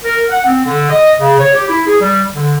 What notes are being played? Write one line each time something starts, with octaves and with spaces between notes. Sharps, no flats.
A#4
F#5
C4
D3
D#5
C#3
C#5
G4
E4
G#4
G3
D3